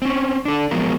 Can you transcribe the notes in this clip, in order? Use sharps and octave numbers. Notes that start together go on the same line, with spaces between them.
C4 C#4
D4 A4
F3 F#3 G#3 B3 A#4